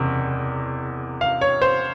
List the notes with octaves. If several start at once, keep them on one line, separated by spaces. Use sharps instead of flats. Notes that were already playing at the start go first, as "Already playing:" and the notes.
Already playing: F#1 E2 C3
F5
C#5
C5